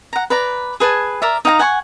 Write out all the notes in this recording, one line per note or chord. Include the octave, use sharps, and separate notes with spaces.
F#5 A#5
B4 D5 A#5
G#4 B4 G#5 A5
A#4 D5 E5
D#4 F5 G5 A#5
F#5 G#5 A#5 C#6